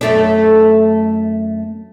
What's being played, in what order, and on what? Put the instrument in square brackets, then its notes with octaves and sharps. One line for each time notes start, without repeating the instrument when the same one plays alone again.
[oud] F#2 A3 D4